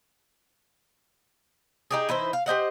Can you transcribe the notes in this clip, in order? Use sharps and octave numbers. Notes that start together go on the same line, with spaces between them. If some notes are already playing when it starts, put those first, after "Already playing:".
D#4 G4 G#4
E3 D#4 E4 C5
F5
G4 C5 D#5 F#5